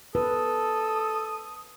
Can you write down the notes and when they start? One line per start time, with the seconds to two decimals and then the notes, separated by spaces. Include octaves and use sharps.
0.15 A4 B4 D#6